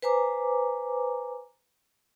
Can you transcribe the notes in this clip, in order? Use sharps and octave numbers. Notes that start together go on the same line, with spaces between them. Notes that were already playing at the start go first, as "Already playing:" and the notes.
B4 C5 G#5 A#5 D6